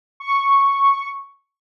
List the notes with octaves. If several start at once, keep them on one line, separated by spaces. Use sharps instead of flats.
C#6